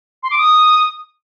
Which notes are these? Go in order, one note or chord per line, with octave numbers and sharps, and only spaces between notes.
C6
D6
D#6